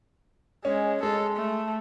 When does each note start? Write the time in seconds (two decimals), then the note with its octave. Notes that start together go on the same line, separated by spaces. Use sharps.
0.65 G#3 C#4
1.03 G#3 A4
1.36 A3